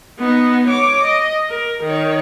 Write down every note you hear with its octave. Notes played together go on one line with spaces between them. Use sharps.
B3 D#4
C#5 D6
D#5
A#4
D#3 C#5